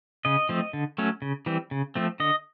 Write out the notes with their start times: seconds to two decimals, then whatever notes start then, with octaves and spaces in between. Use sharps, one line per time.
0.25 C#3 D#5
0.49 F3 A3 C4
0.73 D3
0.98 F#3 A3 C#4
1.22 C#3
1.46 E3 G3 C4
1.71 C#3
1.95 F3 A3 C4
2.20 D3 D#5